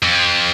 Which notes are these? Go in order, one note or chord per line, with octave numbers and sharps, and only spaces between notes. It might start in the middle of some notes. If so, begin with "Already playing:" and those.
F2